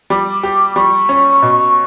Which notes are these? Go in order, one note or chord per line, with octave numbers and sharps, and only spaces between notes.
G3 D6
G4
G3 C#6
C#4
B2